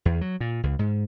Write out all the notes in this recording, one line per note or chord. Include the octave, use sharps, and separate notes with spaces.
E2
F#3
A#2
C#2
G#2